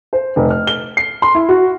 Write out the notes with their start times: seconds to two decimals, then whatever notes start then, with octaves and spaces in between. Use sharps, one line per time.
0.13 C5
0.36 F1
0.50 F6
0.67 G7
0.97 C7
1.22 C6
1.35 E4
1.49 F#4